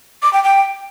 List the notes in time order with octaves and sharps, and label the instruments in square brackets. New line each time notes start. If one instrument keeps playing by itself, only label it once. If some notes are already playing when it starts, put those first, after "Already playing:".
[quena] D6
G5
G5